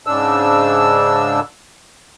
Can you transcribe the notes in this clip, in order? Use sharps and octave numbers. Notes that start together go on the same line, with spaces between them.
G#2 C#3 D4 E6